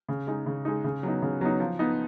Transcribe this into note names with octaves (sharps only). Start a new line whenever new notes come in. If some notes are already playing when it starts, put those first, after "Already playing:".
C#3
G#3 D#4
C#3
G#3 D#4
C#3
F#3 B3 D#4
C#3
F#3 B3 D#4
F3
B3 D#4